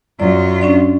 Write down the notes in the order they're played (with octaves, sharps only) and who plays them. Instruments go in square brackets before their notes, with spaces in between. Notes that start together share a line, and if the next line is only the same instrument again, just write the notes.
[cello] F#2 F4 [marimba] D5
[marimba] C#4 D4 D5